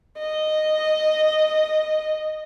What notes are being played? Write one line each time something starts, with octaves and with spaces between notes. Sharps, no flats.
D#5